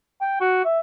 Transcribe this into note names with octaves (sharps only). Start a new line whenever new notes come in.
G5
F#4
E5